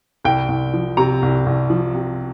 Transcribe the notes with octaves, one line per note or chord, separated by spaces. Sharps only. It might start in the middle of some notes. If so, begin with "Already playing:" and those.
C2 G5
C2
F3
C3 A#5
C2
C2
F3
C3